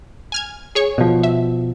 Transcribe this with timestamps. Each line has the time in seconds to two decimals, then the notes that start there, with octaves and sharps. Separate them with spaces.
0.32 G#5 F6 G#6
0.75 G#4 C#5 C#6
0.98 B2 F3
1.23 E5